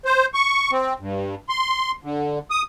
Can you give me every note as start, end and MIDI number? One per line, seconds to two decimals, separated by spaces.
0.05 0.26 72
0.34 0.71 85
0.72 0.93 60
1.00 1.35 43
1.49 1.91 84
2.03 2.39 50
2.51 2.62 87